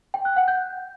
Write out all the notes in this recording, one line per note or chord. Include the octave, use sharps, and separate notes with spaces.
G5
F#6
F#5
G6